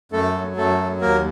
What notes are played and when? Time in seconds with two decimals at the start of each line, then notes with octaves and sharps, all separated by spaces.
0.12 F#2 A3 A4
0.34 F#3
0.57 F#2 A3 A4
0.78 F#3
1.01 D#2 A#3 A#4